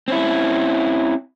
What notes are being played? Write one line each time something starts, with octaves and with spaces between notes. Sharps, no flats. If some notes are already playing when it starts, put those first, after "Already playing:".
C4 C#4 E4